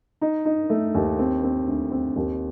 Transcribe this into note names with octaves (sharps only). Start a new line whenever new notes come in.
D#4
D#4
A3
D#2
C4
C4
D2
C4
D#2